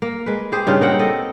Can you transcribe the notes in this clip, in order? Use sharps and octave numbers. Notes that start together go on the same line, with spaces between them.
A#3
G#3 B4
C4 G4 G#4 C5
G2 C#3 D#4 F4
A#3 C4 F#5
A4 D#5